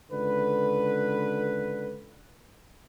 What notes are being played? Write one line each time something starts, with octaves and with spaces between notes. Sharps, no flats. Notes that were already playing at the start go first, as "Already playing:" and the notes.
C#2 D3 B4